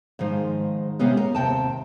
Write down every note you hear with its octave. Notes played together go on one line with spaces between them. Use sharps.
G#2 D#3 F3 G#3
C3 G#3 A#3 B3 C#4 G4
A#4
D#2 C3 G5 A5